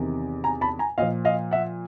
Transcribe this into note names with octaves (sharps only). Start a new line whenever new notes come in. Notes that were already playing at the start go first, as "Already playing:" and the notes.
Already playing: E2 C3 D#3
G#5 A#5
A5 B5
G#5 A#5
A#2 F3 D#5 F5
D#5 F5
E5 F#5